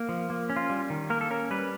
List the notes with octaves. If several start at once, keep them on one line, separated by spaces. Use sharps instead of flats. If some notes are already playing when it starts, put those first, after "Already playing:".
Already playing: A#3
F3
A#3
C#4
F4
G3
D#3
A#3 A#4
A4
C#4 A#4
G3 B4